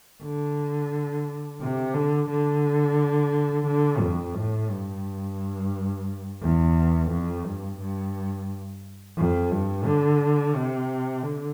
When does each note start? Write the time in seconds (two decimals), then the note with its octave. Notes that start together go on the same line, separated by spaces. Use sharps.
0.23 D3
1.61 C3
1.94 D3
2.29 D3
3.67 D3
4.01 F2
4.36 A2
4.70 G2
6.42 E2
7.11 F2
7.45 G2
7.80 G2
9.17 F2
9.52 G2
9.86 D3
10.55 C3
11.23 D3